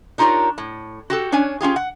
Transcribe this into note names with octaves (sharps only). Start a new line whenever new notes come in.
D4 D#4 F4 G4 A#4 C#5
A2
F#4 G4 A4
C#4 D4 C#5 G#5
C#4 F4 G4 G#4
F#5